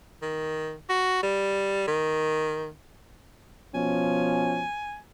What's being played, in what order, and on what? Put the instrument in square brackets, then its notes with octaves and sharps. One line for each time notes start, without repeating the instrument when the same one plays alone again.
[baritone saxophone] D#3
F#4
G3
D#3
[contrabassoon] B2 [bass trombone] F3 [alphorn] C#4 [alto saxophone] G#5